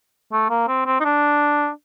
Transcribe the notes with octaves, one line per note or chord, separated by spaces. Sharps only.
A3
A#3
C4
C4
D#4
D4